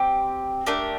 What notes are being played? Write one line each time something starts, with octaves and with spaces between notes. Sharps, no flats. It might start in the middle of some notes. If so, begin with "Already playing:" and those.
Already playing: C4 G4
A3 D4 G4 A#4